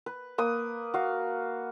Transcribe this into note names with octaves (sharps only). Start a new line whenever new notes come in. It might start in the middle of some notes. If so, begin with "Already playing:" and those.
B4
A#3 B4 D#6
F#4 F5